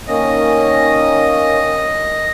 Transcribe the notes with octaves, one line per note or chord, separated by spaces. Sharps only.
D#3 A#3 C#4 D#5